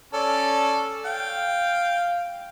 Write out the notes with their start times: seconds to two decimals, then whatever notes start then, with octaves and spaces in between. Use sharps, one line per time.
0.14 C#4 A4 D5
1.05 F5 G5